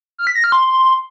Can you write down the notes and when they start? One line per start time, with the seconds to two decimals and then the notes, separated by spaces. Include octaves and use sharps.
0.18 F6
0.27 B6
0.35 A#6
0.44 F6
0.52 C6